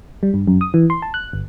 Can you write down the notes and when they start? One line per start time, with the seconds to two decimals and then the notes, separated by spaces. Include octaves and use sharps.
0.23 G3
0.34 G2
0.48 F#2
0.61 D#6
0.74 E3
0.90 C6
1.02 A5
1.14 F#6
1.33 G1